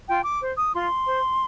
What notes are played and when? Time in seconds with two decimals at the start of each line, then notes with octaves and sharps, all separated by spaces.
0.07 F4 G5
0.25 D6
0.41 C5
0.58 D#6
0.74 F4 C6
1.07 C5